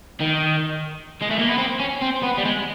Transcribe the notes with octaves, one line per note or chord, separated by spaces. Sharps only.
D#3
G#3
A3
A#3
B3
C4
C#4
C4
B3
G3
G#3